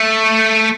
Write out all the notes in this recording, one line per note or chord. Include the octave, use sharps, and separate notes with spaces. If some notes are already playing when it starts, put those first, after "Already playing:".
Already playing: A3